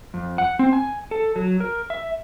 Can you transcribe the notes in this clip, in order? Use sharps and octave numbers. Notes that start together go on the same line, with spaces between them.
F2
F#5
C4
G#5
A4
F#3
A#4
E5